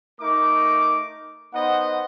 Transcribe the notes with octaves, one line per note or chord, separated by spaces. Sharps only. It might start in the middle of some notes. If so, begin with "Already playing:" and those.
A3 D#4 A#4 D6
B3 D#4 C5 D#5 F#5